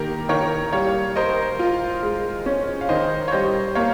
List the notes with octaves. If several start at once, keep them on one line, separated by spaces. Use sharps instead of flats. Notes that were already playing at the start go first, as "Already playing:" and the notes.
Already playing: D#3 A#3 G4 A#4
D#3 A#4 C#5
G3 C#5 F5
A#4 C5 D#5
F4
G#3
C#4
F5
D#3 C5 D#5
C#5
G3 C5 D#5
A#3 C#5 F5